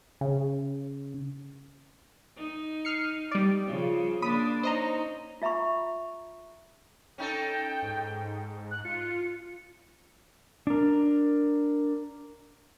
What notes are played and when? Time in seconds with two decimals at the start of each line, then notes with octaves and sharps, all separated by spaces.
0.21 C#3
2.37 D#4
2.85 F6 C7 C#7
3.31 G3 D5
3.67 C#3 F3
4.22 A#3 D4 B5 D#6
4.63 C#4 D#4 C5 D#5 A#5
5.42 F4 E5 A#5 B5 C#6
7.18 C#4 D#4 A4 G5
7.83 G#2
8.71 F#6
8.85 F4 C#7
10.67 D4 A#4